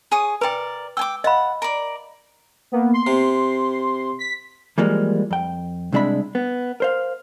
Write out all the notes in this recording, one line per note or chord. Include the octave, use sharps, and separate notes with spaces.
G#4 C#5 D#6
A#4 B4 D5 G5
G5 G#5 D6 E6
D#5 F5 F#5 B5
A#4 D5
A#3 B3
C6
C3
B6
E3 F3 G3 G#3 A#3
F2 G5
C2 C3 G#3 D4 E5 B5
B3
A#4 C5 F5